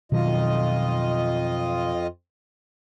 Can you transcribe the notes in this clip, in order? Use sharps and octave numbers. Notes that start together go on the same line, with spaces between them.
F2 B2 D#3 F#3 F4 D#5